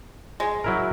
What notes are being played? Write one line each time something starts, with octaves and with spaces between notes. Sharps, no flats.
G#3
F#3 E4 A#4